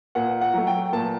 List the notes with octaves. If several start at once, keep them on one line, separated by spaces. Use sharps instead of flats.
A#2 F#5
F#5
F#3 A3
G5
A#2 A5